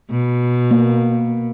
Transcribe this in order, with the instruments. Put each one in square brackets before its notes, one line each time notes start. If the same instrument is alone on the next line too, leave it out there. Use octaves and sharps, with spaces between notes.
[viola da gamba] B2
[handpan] A#3